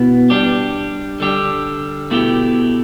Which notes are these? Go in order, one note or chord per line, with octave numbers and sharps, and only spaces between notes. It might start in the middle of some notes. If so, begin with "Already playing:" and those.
Already playing: B2 B3 E4
G3 D4 G4
D3 G3 D4 G4
B2 A3 E4 G4